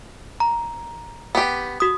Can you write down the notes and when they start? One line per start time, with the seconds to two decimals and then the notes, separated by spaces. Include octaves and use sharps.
0.40 A#5
1.35 B3 G4
1.80 F#4 D#6